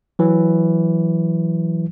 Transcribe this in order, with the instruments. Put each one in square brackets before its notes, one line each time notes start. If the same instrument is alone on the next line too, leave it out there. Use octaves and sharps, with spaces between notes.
[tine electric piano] E3 F#3